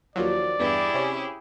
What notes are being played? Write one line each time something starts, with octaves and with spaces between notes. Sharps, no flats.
D#2 F3 F#3 D5
E2 G2 E4 G4 G#4
C3 C#4